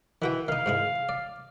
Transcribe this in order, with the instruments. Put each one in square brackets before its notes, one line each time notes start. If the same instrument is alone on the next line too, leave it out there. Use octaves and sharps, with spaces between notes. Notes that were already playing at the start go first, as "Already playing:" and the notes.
[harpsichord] D#3 F#4 G5 [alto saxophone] E3
[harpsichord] D#3 D#4 [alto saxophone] F5
[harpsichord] G#2 G#3 E4
D5